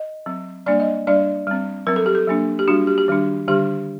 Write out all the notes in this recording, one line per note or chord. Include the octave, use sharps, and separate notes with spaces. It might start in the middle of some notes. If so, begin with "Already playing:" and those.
Already playing: D#5
F#3 C4
G3 A#3 D4 D5
D#5
G3 D4 D5
G3 C4
F#3 C4 A#4
A4
G4
A4
F#3 A#3 D4
G4
G3 D4 F#4
G4
G4
D#3 G3 D4
D3 G3 D4 G4